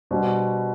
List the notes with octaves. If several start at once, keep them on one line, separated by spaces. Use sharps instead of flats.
B2 G3 D4 F#4 C5